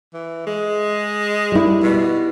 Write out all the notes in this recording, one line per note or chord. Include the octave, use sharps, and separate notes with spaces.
E3
G#3
G3 E4
B2